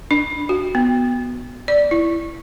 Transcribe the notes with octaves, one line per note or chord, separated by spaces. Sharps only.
D4
F#4
B3
D5
E4